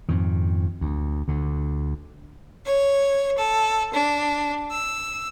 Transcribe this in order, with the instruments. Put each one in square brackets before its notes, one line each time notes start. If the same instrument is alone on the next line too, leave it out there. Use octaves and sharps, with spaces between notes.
[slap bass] F2 G#2 D#3
D2
D2 D3
[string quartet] C#5
A4
D4
E6